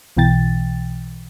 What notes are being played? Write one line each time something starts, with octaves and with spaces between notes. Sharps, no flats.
B1 B2 E3 G5 A6